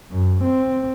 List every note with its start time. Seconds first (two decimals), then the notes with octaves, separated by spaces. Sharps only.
0.13 F#2
0.44 C4